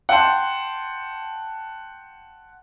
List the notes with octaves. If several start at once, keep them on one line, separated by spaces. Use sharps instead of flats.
F#5 G5 A5 C6